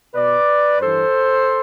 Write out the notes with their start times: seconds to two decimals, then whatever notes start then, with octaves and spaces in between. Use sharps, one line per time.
0.14 B2 B4 D5
0.79 G2 E3 A4 C5